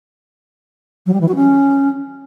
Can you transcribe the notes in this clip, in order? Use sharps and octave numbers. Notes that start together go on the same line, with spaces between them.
F#3
G3
E3
F#4
C#4